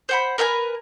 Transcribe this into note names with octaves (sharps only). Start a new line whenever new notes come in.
C5 F#5 B5
A#4 B4 E5 G#5